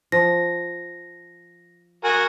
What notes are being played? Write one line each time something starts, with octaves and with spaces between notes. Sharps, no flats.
F3 A#6
F#4 A#4 G#5